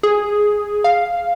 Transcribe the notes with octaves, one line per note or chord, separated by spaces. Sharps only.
G#4
F5